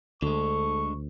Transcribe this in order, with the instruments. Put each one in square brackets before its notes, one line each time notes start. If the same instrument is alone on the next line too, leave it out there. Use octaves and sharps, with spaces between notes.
[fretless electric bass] D2 [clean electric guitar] D3 G#3 [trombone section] A4 [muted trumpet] C#6